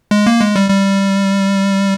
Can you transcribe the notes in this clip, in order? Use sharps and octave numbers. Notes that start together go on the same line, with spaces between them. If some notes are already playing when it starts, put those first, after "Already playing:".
G#3
A#3
G#3
G3
G3